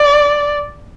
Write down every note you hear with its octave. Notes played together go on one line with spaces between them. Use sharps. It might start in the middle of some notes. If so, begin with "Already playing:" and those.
Already playing: D5